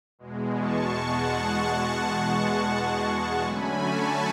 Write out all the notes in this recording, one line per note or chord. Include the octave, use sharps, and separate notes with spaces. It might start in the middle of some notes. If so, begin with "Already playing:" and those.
E2 B2 G#3
A5 C#6
F#5 A5
F#5 A5
D3 F#3 A3 C#4 G#5 B5
A5 C#6